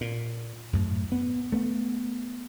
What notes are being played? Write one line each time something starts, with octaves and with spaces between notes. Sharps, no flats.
A#2
F#2 A2
B3
A3 B3